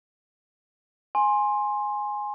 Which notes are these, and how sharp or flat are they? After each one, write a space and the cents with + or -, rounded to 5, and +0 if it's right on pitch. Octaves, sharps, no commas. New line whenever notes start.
G#5 +0 C6 +15